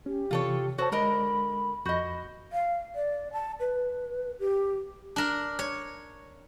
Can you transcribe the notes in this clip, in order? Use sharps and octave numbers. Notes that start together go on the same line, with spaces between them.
C#4 G4
C3 E3 F4 A4 C#5
F#4 A4 C5 C#5 A5
D3 G#3 A#4 D#5 B5
F2 F#4 D#5 B5 G6
F5
D5
A5
B4
G4
D4 A#4
C#5